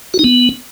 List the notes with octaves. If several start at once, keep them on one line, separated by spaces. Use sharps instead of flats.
F#4
D#4
B3